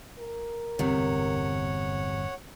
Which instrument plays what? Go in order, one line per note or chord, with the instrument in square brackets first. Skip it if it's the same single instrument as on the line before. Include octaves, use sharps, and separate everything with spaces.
[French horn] A#4
[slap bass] G1 E2 A2 [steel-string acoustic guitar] C3 [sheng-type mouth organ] C#5 F#5